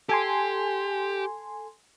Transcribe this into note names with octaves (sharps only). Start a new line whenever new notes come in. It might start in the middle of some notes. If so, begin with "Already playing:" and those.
G4 A4 G#5 C6